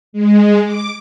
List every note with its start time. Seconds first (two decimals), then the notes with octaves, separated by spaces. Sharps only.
0.13 G#3
0.64 D6